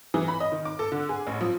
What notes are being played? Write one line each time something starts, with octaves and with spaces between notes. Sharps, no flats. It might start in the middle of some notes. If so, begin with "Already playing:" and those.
E3
B5
D#5
D#3
D6
A4
D3
G#4
A1
F3